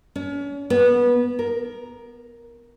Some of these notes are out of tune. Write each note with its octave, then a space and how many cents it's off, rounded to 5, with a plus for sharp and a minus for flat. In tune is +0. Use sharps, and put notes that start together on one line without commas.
C#4 +40
B3 -20
A#4 +10